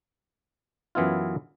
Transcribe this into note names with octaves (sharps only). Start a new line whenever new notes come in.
F#2 E3 B3 E4 F4